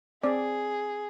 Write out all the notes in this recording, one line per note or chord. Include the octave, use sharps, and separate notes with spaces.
C4 G#4 D5